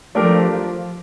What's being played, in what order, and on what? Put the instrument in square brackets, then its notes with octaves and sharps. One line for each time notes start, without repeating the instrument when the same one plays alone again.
[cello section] F3 [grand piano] A3 D4 G4 A#4